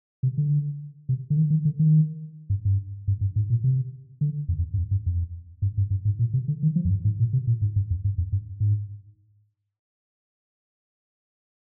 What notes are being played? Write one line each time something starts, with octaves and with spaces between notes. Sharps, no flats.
C3
D3
C3
D3
D#3
D#3
D3
D#3
G2
G2
G2
G2
G#2
A#2
C3
D3
F2
F2
G2
F2
G2
F2
G2
G2
G2
G#2
A#2
C3
D3
D#3
F3
F2
G2
G#2
A#2
C3
A#2
G#2
G2
F2
G2
F2
G2
G#2